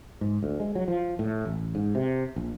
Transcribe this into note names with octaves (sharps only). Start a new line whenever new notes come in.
G#2
D2
G#3
F#3
F3
A2
A1
G#2
C3
A#1